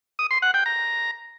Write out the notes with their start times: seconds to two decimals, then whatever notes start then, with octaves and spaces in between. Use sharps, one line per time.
0.19 D#6
0.31 C6
0.42 F#5
0.54 G5
0.66 A#5